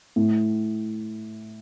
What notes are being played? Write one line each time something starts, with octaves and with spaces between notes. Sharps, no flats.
A2